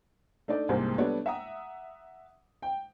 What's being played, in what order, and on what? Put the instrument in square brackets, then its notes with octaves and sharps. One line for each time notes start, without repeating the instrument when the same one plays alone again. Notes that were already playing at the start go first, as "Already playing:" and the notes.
[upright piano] A3 D4 D#4 D5
C2 G#2 C3 G#3 A#3 C4
G3 A3 B3 D4 C#5
E5 F#5 A#5 D#6
G5